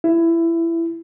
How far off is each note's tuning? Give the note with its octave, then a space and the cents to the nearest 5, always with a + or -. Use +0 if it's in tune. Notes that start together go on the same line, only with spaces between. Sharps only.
E4 +20